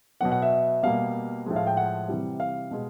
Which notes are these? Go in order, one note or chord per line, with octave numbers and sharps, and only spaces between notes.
B2 F#3 B3 F#5
F#5
E5
B2 G3 A#3 F5
A2 F3 G#3
F5
G5
F#5
C3 E3 G3
F5
B2 G#3